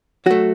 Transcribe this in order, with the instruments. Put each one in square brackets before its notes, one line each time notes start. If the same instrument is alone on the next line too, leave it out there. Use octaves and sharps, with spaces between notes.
[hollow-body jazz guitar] F#3 A3 F#4